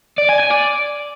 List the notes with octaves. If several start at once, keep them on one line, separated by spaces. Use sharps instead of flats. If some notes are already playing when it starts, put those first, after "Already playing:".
D5
G#5
G#5
D5